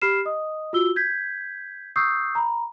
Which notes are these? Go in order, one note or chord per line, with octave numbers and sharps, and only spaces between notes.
G4 B5 F6 C7 E7
D#5 D#6
F4 F#4 E6 G7
G6 G#6 B6
C#6 D#6 E6 G6 C7
A#5 B5